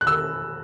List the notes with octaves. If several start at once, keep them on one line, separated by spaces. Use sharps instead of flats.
F#6
E6